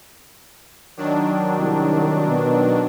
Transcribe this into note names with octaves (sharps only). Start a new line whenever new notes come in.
D#3 F#3 D4
C2
B2